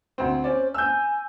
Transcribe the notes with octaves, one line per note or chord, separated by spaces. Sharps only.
D2 C4
C#4 C5 D5
G#5 E6 G6